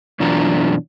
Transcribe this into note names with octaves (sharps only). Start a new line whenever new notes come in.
F#2 B2 E3 D4 F4 A#5